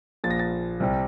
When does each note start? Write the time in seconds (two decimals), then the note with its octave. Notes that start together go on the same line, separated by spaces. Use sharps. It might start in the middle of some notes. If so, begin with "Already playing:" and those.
0.24 A#1 A#2 F3 A6
0.31 A#6
0.39 A6
0.80 C2 C3 G3